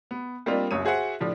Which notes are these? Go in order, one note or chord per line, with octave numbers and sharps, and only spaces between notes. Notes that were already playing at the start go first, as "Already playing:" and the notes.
B3
G3 A#3 C4 D4 F4 D#5
F#1 C#2 F#2 C#5 D#6 D#7
F#4 G#4 C5 E5 F#5
A2 F3 D4